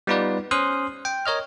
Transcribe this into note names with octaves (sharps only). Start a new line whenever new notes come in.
G3 B3 D#4 F4 B4 D5
C#4 C5 C6 D#6 F6 F#6
G5
A#4 C#5 D#5 F6